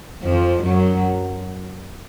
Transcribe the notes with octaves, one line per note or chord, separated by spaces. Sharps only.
F2 F3
F#2 F#3